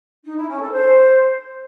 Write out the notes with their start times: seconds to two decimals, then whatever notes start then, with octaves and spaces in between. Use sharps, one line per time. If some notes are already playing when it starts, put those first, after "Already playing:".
0.25 D#4
0.36 E4
0.48 C#4
0.60 A4
0.72 C5